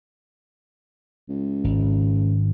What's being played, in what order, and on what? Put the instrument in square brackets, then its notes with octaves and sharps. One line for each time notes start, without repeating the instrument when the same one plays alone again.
[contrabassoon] C#2
[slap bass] G#1